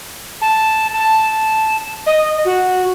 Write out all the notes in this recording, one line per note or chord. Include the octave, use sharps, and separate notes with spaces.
A5
A5
D#5
F#4